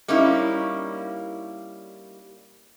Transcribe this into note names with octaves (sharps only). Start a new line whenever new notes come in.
G3 A#3 C#4 D#4 E4